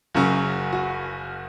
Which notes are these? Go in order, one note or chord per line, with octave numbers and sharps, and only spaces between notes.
F#1 F#2 C#3 F#3 F#4
F#4